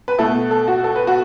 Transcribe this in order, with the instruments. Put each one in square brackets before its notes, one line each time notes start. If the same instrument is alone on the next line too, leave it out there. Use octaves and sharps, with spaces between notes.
[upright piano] B4
B2 A3 E4 A4
A4
F#4
A4
B4
F#4